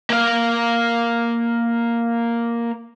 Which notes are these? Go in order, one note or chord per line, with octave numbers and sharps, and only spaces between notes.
A#3 F5